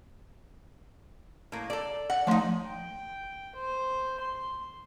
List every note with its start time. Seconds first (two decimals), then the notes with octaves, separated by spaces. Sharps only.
1.52 A2 A#3
1.70 A4 D5
2.10 D5 F#5
2.27 F3 A3 D4 D#4 C6
2.66 G5
3.55 C5
4.20 C6